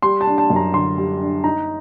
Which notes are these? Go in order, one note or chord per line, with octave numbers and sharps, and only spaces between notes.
G3 C6
A5
D4
A5
F#2
A#5
D3 C6
G3
D4
D#4 A#5